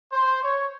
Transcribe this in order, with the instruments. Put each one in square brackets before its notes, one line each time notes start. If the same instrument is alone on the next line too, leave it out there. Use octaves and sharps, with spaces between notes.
[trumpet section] C5
C#5